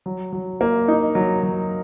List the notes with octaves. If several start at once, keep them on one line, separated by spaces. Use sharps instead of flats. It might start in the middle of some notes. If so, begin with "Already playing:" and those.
F#3
F#3
A#3
D#4
F#3
F#3